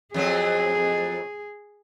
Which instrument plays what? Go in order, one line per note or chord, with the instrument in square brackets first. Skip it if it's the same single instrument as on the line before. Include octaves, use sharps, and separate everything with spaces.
[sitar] F2 F#3 C4 [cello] G#4